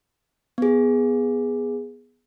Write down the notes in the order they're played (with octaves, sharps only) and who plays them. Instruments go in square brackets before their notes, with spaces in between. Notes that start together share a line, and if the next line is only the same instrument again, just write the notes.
[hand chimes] B3 G#4